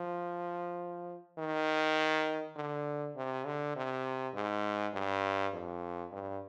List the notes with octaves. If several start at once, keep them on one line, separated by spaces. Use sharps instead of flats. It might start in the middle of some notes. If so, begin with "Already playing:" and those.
Already playing: F3
D#3
D3
C3
D3
C3
G#2
G2
F2
G2